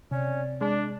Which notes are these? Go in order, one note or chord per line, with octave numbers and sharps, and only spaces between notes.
C3 C#4 D5
G#3 D4